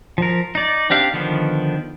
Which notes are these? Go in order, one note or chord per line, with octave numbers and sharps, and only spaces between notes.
F3 A#4
D#4 D5
C4 D4 G4 F5
D3 D#3 F3 B3